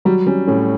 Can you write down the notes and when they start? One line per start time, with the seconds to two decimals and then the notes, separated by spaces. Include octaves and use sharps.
0.05 F#3 G3
0.26 G3 C#4
0.47 A2 C#4